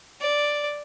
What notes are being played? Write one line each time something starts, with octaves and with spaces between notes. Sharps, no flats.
D5